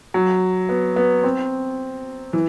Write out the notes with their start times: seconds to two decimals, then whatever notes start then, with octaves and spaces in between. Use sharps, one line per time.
0.14 F#3
0.69 B3
0.96 B3
1.24 C4
2.33 E3